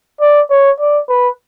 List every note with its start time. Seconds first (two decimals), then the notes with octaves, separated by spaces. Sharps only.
0.21 D5
0.50 C#5
0.80 D5
1.09 B4